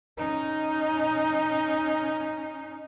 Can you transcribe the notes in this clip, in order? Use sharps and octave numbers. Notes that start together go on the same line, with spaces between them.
C#4 D#4